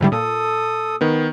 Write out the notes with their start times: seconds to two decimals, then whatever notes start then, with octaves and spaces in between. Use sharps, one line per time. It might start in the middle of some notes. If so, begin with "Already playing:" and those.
0.01 G#2 D3 G3 E4 G4
0.12 A#2 A4 D#6
1.01 D#3 B3